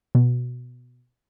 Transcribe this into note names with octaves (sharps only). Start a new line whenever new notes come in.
B2